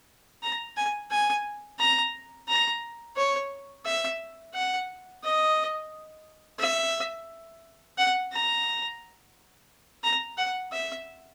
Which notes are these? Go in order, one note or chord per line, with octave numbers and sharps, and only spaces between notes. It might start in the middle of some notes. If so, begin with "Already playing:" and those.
A#5
G#5
G#5
A#5
A#5
C#5
E5
F#5
D#5
E5
F#5
A#5
A#5
F#5
E5